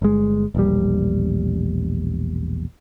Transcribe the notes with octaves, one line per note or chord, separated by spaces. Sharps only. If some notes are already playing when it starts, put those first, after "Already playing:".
G1 G#3
E1 A#1 G3